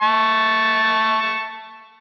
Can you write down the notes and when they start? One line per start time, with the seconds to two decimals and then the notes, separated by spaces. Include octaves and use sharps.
0.02 A5 C#6